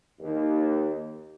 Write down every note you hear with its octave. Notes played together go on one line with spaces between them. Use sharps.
D#2